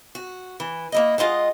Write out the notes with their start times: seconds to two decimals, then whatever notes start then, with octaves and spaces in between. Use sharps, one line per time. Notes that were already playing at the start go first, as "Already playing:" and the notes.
0.15 F#4
0.60 E3
0.92 A#3 E4 D#5
1.18 G#3 F4 D#5 F#5